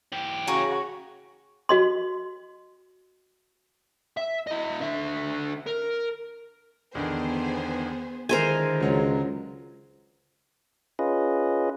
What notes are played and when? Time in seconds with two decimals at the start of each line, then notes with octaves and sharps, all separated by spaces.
0.13 E3 G4
0.47 C#3 F#4 G#5 A#5 C#6
1.69 F#4 D#5 C6
4.17 E5
4.47 E4 D#5
4.80 D3 E5
5.67 A#4
6.95 E2 D3 D#3 B3 G#4 C5
8.29 D3 D#3 G#3 E4 A#4 C5 G#5
8.81 C#2 F#3 G#3
10.99 C#4 F4 G#4 B4 D#5